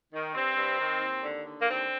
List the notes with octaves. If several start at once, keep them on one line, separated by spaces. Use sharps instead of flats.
D#3
G2 C4
G2
D#3
D#2
D3
D3
A#3
D#2 C4